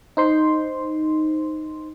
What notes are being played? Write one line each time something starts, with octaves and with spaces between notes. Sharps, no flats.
D#4 C5 C6